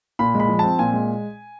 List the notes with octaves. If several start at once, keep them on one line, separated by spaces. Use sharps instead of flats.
A#2 B5
G#3
B5
F3
C4 A5
A#2 G#5
G#3